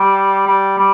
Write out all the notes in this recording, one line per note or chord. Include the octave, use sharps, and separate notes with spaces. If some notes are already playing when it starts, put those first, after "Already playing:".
Already playing: G3
G3
G3